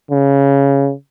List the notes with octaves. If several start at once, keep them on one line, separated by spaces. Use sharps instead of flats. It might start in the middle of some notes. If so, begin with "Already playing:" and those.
C#3